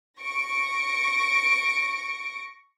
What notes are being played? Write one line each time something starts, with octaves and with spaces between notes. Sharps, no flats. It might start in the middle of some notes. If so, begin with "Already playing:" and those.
C#6 A#6 D7